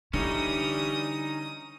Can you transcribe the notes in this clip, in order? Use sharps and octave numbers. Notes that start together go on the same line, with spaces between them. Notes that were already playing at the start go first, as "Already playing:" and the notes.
D3 E3 G3 C#4 D#4 D#6